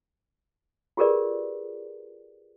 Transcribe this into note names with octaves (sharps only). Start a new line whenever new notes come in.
F4 G4 G#4 A#4 B4 D5